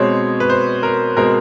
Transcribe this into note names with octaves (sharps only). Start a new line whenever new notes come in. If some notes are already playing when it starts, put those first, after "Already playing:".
Already playing: B2 G#3 C4 C#5
B4
C5
A#4
B2 G#3 C4 A#4